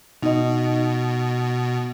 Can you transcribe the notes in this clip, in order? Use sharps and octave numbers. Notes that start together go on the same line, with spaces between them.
B2 D#4 D#5